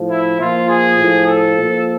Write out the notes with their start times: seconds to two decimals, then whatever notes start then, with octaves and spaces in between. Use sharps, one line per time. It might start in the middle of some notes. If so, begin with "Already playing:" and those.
Already playing: A2 F3
0.10 E4
0.39 A#2 F3 F4
0.69 G#4
0.98 A2 F3
1.28 A4
1.57 A#2 F3